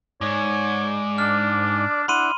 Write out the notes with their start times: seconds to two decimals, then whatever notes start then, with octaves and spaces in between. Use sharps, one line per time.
0.21 G#2 C#5 D5
1.18 D4 F6
2.08 D4 E4 F#5 B5 C6 D#7